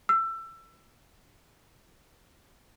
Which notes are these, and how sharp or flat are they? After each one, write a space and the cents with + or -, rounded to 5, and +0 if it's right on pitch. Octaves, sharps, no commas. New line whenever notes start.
E6 +25